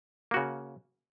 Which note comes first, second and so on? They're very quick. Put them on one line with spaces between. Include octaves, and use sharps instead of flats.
A#3 F#4 C#3